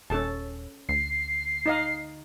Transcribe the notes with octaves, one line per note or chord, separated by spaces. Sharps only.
D#1 C#4 A4 A5
D2 C7
D#4 D#5 F5